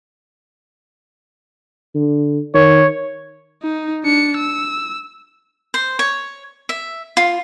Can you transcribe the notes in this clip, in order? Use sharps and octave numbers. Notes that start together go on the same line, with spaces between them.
D3
D#3 C#5
D#4
D4 C#7
E6
C5
C#5
E5
F4